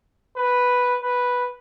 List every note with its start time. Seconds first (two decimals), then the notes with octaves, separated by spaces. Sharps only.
0.36 B4
1.01 B4